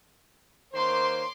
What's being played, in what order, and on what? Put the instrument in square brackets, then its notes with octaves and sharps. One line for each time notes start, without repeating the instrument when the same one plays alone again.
[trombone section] D#3 A#3 C5 [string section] C#5 C6 D6